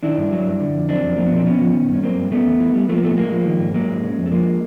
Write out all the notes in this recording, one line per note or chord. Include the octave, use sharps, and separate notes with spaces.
D#3 D4 E4
G2
F#3
G2
D3
F2
F#3 C4 D4
F2
F3 A#3
B3
A#2 C4
A#2 B3 C#4
F3
D#3
G2 C#4
F#3 A#3 C4
G2
C#3 A3 B3
E2
E3
G3
F3 A3 B3
A#3
A2 A3 B3
A2 G#3 A#3
F3
D#3
G#2
F#3 G#3 A#3
G#2
C#3
F2
A3
F3 G#3 A#3